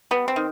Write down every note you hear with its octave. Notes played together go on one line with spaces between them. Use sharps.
G3 B3
C4
D#3